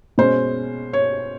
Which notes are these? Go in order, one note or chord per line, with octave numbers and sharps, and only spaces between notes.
B2 G#3 C#4 C5
C#5